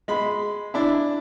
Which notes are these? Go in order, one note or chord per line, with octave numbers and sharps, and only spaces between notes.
G#3 B5
D4 E4